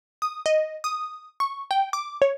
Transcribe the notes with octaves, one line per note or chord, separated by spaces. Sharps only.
D#6
D#5
D#6
C#6
G5
D6
C#5